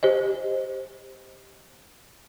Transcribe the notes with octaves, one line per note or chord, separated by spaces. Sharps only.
G4 C5 D#5